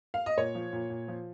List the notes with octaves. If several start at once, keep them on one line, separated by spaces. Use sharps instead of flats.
F5
D#5
A#2 C#5
F3
A#2
A#2
F3